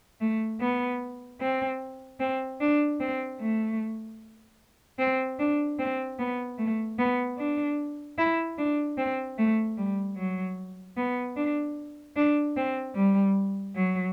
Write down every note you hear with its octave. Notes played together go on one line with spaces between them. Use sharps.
A3
B3
C4
C4
D4
C4
A3
C4
D4
C4
B3
A3
B3
D4
E4
D4
C4
A3
G3
F#3
B3
D4
D4
C4
G3
F#3